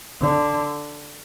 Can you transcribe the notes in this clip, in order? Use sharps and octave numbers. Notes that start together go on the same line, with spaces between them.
D3